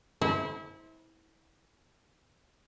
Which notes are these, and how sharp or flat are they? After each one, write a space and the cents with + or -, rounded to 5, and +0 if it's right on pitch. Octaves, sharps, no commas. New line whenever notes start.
E4 -30 C5 +0